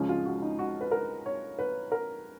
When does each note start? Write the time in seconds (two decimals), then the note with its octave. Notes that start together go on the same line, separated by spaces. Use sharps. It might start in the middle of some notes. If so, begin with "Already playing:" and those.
Already playing: C#2 C#3 F3 G#3 C#4
0.09 F4
0.26 F#4
0.42 D#4
0.59 F#4
0.81 B4
0.91 A#4
1.26 C#5
1.59 B4
1.92 A#4